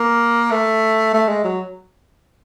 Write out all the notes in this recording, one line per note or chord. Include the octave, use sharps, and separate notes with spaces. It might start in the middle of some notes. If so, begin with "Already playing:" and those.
Already playing: A#3
A3
A3
G#3
F#3